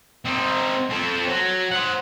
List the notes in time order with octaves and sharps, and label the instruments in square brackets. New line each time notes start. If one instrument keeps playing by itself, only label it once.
[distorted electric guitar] C4 D#4
C4 A4
F#3
C5 F#5